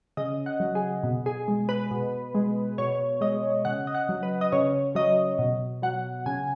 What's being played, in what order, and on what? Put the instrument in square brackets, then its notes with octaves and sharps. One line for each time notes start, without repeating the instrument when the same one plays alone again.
[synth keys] C#3 D#5
F#5
F#3
G#4
B2
G#4
G#3
B4
B2
G#3
B2 C#5
G#3 D#5
C#3 F#5
D#5
F#5
F#3
B4
D#5
C#3 C#5
F#3 D#5
B2
F#3 F#5
C#3 G#5